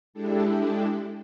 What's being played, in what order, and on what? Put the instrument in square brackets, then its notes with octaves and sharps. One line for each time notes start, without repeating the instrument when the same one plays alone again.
[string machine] G#3 D4 E4 G4 A4